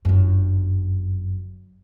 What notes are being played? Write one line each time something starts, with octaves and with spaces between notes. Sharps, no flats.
G1 F#2